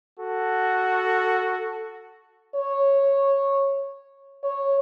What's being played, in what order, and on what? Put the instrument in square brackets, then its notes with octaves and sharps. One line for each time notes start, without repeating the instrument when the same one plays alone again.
[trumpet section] F#4 A4
[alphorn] C#5
C#5